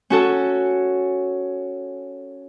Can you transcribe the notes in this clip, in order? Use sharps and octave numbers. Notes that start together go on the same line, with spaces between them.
C#4 F#4 A4